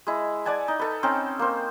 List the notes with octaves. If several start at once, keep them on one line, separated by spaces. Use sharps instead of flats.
G#3 E4
D5 F#5 G#5 A5
D#4
A4 B4
C4 C#4 D#4 G5
A#3 C5